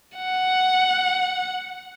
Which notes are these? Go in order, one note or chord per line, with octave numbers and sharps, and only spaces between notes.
F#5